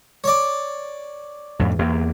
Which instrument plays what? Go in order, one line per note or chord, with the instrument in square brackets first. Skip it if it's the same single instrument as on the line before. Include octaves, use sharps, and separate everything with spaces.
[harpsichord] C#5 D5
[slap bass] F2 A2
E2 A#3